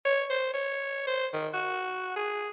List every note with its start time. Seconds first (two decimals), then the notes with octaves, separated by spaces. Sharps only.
0.05 C#5
0.30 C5
0.54 C#5
1.07 C5
1.33 D#3
1.54 F#4
2.16 G#4